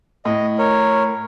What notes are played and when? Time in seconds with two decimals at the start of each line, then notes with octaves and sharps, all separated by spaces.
0.25 A2 D#5
0.58 A#4 C#5